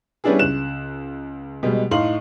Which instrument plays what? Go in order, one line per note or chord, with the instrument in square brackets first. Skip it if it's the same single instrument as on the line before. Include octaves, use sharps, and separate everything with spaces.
[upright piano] G3 B3 C#4 D4 E4 G#4
C#2 F#6 E7
B2 G3 G#3
A2 D#4 F5 C6 F#7